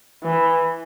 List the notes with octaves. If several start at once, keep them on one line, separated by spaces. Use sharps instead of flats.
E3